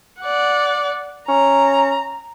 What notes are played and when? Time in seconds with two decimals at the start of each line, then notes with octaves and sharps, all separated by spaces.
0.21 D5 F#5
1.28 C#4 A#5